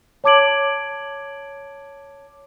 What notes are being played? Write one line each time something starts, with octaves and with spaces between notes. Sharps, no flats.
C#5 A5 D6 G#6 D7 F#7